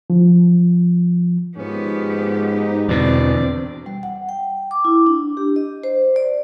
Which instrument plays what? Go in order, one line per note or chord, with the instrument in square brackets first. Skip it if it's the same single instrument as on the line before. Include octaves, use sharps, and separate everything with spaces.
[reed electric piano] F3
[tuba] G#2 [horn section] D#3 F3 C#4 [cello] B3 G4
[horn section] D#4
[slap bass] E2 B2 [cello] D3 C4 [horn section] F3 B4 D5
[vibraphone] G3
F#5
G5
D6
E4
D4
G4
D#5
C5
D5